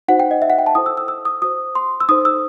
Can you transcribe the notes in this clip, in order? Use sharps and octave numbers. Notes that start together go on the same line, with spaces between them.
D#4 F#4 C5 F#5
G5
D#5
E5
F#5
G5
A5
E4 A4 C5 D#6
E6
E6
E6
D#6
F#4 C5 D#6
C6
E6
D#4 A4 C5 D#6
E6